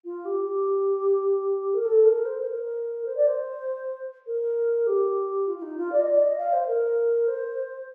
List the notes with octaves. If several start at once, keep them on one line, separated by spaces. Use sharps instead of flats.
F4
G4
G4
A#4
A4
A#4
C5
C5
A#4
C5
D5
C5
A#4
G4
F4
F4
D#4
F4
D5
D#5
D5
D#5
F5
C5
A#4
C5